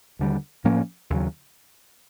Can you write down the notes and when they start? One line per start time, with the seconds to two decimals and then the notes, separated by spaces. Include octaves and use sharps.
0.19 D#2 D3 G3
0.64 A2 F3 A#3 C#4
1.10 D#2 C#3 F#3